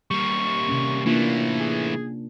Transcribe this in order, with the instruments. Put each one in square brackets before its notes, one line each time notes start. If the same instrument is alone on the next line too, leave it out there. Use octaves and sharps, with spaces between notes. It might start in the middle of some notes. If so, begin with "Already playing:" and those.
[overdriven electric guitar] G3 A#3 [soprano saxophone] C#6
[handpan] C3 C#4
[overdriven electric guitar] E3 A3 [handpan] A#3 D4 F4
[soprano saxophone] G#4